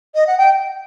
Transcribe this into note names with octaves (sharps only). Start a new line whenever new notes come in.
D#5
F#5
G5